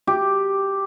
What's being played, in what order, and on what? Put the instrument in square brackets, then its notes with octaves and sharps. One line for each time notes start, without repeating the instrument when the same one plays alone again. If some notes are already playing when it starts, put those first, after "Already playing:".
[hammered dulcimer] G4